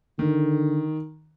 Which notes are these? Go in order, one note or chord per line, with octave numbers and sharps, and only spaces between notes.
D3 D#3